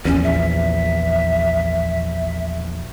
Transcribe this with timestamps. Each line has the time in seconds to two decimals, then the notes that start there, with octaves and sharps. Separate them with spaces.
0.05 A#1 E2 C#4
0.23 E5